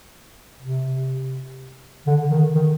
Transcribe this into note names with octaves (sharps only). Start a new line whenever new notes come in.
C3
D3
D#3
D#3